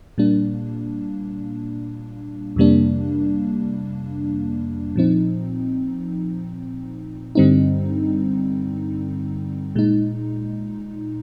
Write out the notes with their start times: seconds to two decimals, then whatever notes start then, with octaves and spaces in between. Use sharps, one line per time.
0.18 A#2 G3 A#3 D4
2.56 F2 C3 G3 A#3 D4
4.96 A#2 F3 C4 D#4
7.35 G2 D3 G3 C4 D#4
9.75 A#2 G#3 D#4